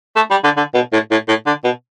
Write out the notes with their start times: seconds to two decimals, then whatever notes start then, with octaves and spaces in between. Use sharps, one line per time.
0.16 A3
0.31 G3
0.44 D3
0.57 D3
0.74 B2
0.93 A2
1.11 A2
1.28 A2
1.47 D3
1.64 B2